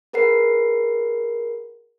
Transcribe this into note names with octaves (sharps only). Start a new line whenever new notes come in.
G#4 A#4 B4 F#5 C7